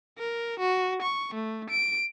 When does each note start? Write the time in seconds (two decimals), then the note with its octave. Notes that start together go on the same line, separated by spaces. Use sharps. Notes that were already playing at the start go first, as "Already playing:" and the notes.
0.19 A#4
0.60 F#4
1.03 C#6
1.35 A3
1.70 D7